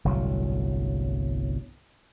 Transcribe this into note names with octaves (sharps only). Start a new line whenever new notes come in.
G1 C2 A2 F#3